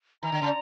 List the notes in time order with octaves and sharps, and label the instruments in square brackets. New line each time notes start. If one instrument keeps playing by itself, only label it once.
[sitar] D#3 [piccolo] A#5
[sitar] D3
C#3